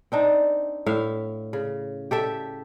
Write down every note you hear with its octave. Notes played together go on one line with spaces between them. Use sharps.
C4 D4 D#4
A2 E5 F5
C#3
G4 A4 E5